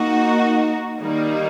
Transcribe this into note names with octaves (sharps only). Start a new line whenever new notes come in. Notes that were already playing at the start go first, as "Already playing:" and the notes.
Already playing: A#3 D#4 F#4
D#3 G3 A#3 D#4